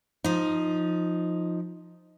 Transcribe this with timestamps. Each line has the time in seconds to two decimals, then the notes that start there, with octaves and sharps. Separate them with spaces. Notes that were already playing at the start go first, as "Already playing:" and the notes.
0.24 F3 D#4